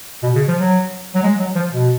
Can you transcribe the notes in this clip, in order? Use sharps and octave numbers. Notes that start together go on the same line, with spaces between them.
B2
C#3
F3
F#3
F#3
G#3
F#3
F3
B2